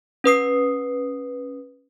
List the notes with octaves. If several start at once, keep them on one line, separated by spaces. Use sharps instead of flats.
C#4 B4 D#6 C7